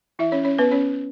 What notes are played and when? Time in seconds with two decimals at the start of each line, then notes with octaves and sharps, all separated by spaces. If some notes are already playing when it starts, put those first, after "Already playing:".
0.19 E3 E4 E5
0.32 C#4 C#5
0.45 C#4 C#5
0.59 B3 B4
0.71 C#4 C#5